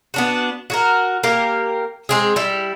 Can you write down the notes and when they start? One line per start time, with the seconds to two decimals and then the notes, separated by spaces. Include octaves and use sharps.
0.14 B3 D4 F#4
0.70 F#4 G#4 A#4
1.23 A#3 G4 A#4
2.09 G#3 C4 G#4
2.36 G3 E4